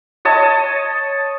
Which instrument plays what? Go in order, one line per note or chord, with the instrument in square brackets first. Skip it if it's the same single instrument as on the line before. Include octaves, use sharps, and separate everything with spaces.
[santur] C#5 D#5 A5